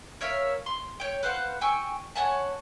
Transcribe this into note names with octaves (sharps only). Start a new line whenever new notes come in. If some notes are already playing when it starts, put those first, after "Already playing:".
A#4 C#5 E5 F5
C6
C#5 G5
B4 C5 F5 F#5
G5 G#5 C#6 E6
C#5 F#5 G#5 A5